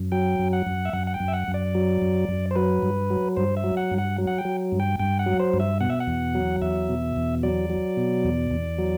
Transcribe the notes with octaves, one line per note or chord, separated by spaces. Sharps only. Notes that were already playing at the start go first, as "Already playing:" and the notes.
Already playing: F#2
F#3 G5
F#2
F#5
F#2
E5
F#2 F#5
F#5
G5
F#2
E5
F#5
F#2
D5
F#3
F#2
F#2
C5
F#3 B4
G2
F#3
G2 C5
E5
F#3
F#5
G2
F#5
F#3
F#5
G5
F#3
G2
G5
G2 G5
F#5
F#3
C5
G2
E5
B2 F#5
E5
F#5
E2
F#3
E2 E5
B2
E2
F#3 D5
F#3
B2
E2
E2
F#3